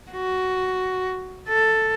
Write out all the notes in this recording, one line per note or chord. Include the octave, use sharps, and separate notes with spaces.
F#4
A4